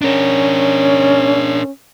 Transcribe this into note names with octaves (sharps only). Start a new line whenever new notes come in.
C#4 D4 A#4